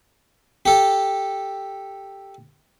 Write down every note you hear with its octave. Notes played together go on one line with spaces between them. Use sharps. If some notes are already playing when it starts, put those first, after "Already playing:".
G4 A4